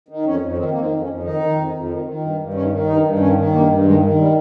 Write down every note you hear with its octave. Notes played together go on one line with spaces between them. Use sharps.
D#3
F2 C#4
F2
D#3 C4
D#3 A#3
C4
F2
C#4
F2
D#3 D#4
D#3
F2
F2
D#3
D#3
G2
G2
D#3 C#4
D#3
G2 D#4
G2
D#3 C#4
D#3
G2 A#3
G2
D#3 G#3
D#3
G3